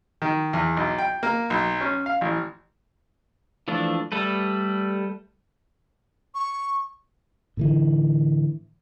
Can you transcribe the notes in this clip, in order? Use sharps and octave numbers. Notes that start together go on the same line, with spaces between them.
D#3
E2
B1
G5
A#3
B1
C#4
F5
A1
E3 F3 A3 D4
G3 A3 A4 B4
C#6
A2 D3 E3